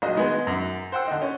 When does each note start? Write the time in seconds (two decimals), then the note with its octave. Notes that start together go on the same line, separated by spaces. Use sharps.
0.02 A#1 F#3 D#5
0.16 D#3 G#3 B3
0.47 F#2
0.92 C5 F#5 G5 E6
1.07 D3 D#4
1.22 C#4